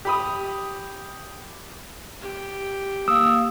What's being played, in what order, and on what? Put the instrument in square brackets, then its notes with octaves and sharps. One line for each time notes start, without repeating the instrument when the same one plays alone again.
[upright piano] G4 B5 D#6
[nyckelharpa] G4
[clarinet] A#3 [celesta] D#6 [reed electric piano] E6